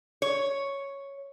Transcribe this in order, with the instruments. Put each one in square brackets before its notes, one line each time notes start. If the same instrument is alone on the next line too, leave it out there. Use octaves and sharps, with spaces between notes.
[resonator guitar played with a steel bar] C#5